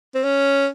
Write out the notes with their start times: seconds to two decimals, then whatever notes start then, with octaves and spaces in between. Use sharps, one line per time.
0.15 C4
0.24 C#4